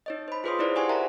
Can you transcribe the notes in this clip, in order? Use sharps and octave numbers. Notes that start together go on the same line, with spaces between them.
D#4 C#5 D#5
C5 B5
F4 G#4 B4 C#5 C6 D#6
D#4 E4 C5 D5
G4 C5 F#5 G#5 C6 C#6
A#4 C5 E5 F#5 A5 A#5